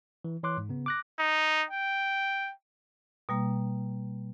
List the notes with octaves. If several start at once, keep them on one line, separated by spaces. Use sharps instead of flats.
E3
E3 C#5 C6 D6 F#6
G#2
C#3 B3
D6 F#6 A#6
D#4
G5
B2 G3 A#3